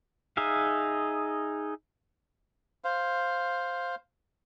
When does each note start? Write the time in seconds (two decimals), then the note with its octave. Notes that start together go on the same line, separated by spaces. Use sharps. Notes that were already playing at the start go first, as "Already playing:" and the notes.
0.37 D#4 G#4 E5 F5
2.84 C5 F5